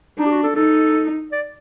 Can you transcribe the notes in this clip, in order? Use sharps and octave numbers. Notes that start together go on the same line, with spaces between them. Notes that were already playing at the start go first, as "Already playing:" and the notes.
D4 D#4
G4
F#4
A4
D#4 A4
D5